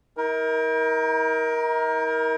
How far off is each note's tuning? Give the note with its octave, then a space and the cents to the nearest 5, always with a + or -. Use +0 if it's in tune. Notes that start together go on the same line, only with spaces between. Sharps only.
D#4 +45 A#4 +15